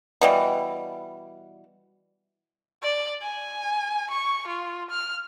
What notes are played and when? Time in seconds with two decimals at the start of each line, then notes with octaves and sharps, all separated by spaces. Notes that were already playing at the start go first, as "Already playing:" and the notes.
0.21 B2 E3 G3
2.83 D5
3.22 G#5
4.10 C#6
4.47 F4
4.90 F6